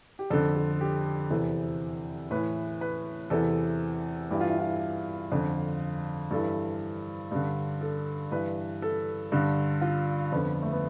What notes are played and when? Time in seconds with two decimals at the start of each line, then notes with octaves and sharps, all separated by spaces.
0.19 G4
0.30 F2 D3 A4
0.56 A4
0.81 G4
1.30 E2 C3 E3 A4
2.31 A2 E3 B4
2.81 B4
3.30 E2 C3 E3 A4
4.31 G2 E3 G4
4.41 F4
4.49 E4
4.59 F4
5.32 F2 D3
6.31 G2 E3 A4
7.32 G2 D3
7.81 A4
8.31 G2 E3 B4
8.82 A4
9.32 G2 D3
9.81 F4
10.32 F2 D3 B3
10.63 A3
10.72 B3